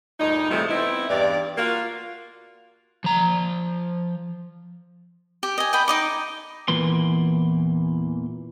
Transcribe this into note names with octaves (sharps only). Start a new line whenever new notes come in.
D2 G2 A#2 D#4
G#2 C3 E3 F3 G3 A3
B3 C4 D#4 E4
E2 G2 D5
A#3 F4 F#4
F3 A#5
G4
D#5 G#5
D#5 G5 B5
D#4 D#5 D6
E2 A#2 E3 A#3 B4 C6